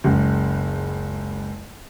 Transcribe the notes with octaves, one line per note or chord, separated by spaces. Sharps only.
F#1 C#2